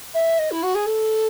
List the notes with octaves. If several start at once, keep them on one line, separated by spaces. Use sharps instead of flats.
E5
D#5
E4
F#4
G#4
A4